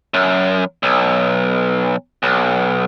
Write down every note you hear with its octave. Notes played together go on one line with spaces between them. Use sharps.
F#2
B1
B1